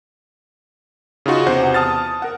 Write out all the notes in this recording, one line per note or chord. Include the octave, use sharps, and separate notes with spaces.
C#3 D#4 F4 F#4
E2 C3 C5 F#5
A5 D#6 F6 A6
A#4 F#5